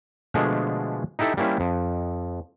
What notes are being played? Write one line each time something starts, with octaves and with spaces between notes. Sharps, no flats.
B2 D3 F3 G#3 A3 G#4
D#4 E4 G4 A4 E5
G3 A#3 C#4 E4 C5
F2